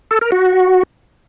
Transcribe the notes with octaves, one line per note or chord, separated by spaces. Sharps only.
A4
A#4
F#4